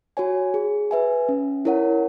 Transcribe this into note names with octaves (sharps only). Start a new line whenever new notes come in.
F#4 C#5 G#5
G#4
B4 E5 G#5
C#4
E4 A#4 C#5 F#5